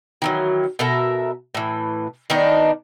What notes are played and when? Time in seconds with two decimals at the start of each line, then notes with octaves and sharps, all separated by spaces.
0.22 D#3 E3 F#3
0.79 B2 A4 A#4 E5
1.55 A2 E3
2.30 D#3 B3 D4 D#4